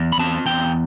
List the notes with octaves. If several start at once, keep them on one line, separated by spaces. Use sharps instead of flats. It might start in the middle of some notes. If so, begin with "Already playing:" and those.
Already playing: E2
B5
C4 A5
E2 G5